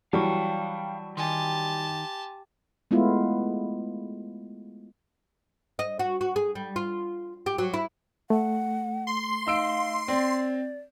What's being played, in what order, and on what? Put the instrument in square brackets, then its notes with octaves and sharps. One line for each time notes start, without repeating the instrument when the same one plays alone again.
[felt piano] E3 F#3 G3 [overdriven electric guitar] F5 G5 [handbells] A5 C#6
[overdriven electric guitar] D#3 [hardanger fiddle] G4 A5 [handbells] G#5 C6
[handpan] G#3 A3 B3 E4 F4
[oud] D#5
F#4
F#4
G#4
G3
F4
G4
F#3
E4
[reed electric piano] A3 [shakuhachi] F#5
[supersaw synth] C6
[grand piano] D#4 E6 D7 [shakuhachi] F5
[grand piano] C4 [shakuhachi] D5